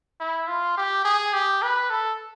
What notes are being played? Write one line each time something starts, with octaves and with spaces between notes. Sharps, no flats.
E4
F4
G4
G#4
G4
B4
A4